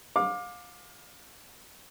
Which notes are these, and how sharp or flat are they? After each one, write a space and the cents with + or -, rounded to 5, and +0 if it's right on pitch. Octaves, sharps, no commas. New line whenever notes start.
F5 +30 D6 +10